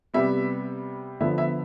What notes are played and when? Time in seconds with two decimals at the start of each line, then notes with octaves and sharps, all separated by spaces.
0.14 C3 G3 B3 E5
1.20 D3 F3 B3 E5
1.38 E5